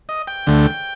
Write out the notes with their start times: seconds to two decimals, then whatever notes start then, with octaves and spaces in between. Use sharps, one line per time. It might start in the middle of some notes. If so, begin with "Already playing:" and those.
0.09 D#5
0.27 G5
0.47 D2 D3 A3